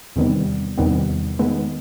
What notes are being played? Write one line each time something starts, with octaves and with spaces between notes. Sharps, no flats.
E2 C3 D#3 G3 B3
E2 C3 D#3 G3 B3
D#3 G#3 B3